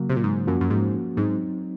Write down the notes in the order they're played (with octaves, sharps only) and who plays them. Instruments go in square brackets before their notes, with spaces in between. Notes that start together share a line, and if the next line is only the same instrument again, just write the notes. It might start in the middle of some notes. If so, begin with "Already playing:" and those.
Already playing: [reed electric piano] C#3 F#3 A#3
[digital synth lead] C3
A#2
G#2
[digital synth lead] F#2 [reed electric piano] F3 A#3 C#4 F#4
[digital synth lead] F#2
G#2
[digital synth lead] G#2 [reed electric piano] F#3 C4 D#4